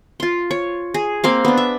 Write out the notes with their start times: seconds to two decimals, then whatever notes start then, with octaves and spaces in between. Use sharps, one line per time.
0.20 F4 C6
0.51 C#5
0.94 G#4
1.24 A#3 C4 F5
1.45 B3 D4
1.57 E5